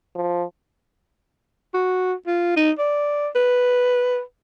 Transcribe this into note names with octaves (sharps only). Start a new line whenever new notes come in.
F3
F#4
F4
D#4
D5
B4